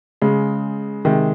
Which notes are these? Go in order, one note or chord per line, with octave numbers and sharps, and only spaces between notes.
C#3 G#3
C3 D#3 G#3